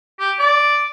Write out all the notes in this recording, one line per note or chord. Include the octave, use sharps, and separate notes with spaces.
G4
D5